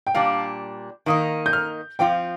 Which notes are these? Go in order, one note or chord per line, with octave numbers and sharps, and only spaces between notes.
G5
A#2 G3 D4 F5
D#3 A#3 D#4 D#6
G6
F6
F3 C4 F4 G5